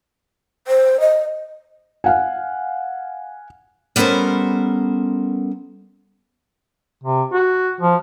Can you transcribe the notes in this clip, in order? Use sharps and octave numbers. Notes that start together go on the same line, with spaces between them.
C5
D#5
F5 F#5 G#5
G3 B3 C#4 A4 A#4 C5
C3
F#4
F3